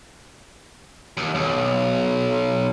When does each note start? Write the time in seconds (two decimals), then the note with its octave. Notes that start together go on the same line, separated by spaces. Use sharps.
1.17 D#2
1.35 B1